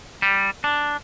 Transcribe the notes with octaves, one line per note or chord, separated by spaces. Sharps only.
G3
D4